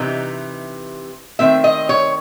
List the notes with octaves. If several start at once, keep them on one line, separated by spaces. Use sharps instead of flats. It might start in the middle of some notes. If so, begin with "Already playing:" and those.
Already playing: C3 E3 D#4
D#3 A3 C4 E5
D#5
C#5